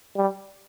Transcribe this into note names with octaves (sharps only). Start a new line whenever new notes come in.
G3